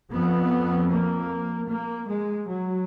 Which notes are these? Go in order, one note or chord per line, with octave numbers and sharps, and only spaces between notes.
F2 B3
A#3
A#3
G#3
F#3